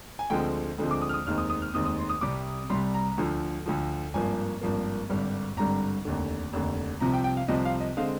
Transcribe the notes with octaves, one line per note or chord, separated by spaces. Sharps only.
G#5
D2 D3 F3 G#3 C4 G5
D2 D3 F3 G#3 C4
D6
D#6
F6
D#6
F1 D#2 D#3 G#3 C4 F6
D#6
D#6
F6
F1 D#2 D#3 G#3 C4 D#6
D#6
C6
D#6
C2 C3 G3 D6
C2 C3 G3 C6
A#5
D2 D3 F3
D2 D3 F3
G#1 G2 F3 A#3 G#5
G#1 G2 F3 A#3
G#1 G2 D3 G3
G#1 G2 D3 G3 A#5
F1 D#2 D3
F1 D#2 D3
C2 C3 F3 C4 A#5
G5
G5
F5
C2 C3 F3 C4 D#5
F5
D#5
D3 G#3 C4 F5